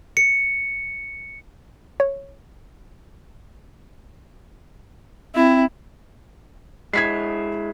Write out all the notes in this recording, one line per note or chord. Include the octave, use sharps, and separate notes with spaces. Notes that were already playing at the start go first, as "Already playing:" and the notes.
C#7
C#5
C4 E4
G#3 E4 G#6 B6 C7